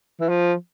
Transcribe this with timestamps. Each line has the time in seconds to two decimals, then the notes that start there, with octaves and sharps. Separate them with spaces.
0.20 E3
0.29 F3